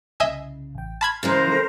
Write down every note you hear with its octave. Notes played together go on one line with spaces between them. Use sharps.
C2 C#3 D#5 E5 G#5
A1 G5
A5 B5 C6 F6 G#6
C#3 E3 G#3 A#4 C5
F3 A4